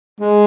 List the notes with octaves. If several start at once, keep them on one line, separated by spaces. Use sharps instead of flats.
G#3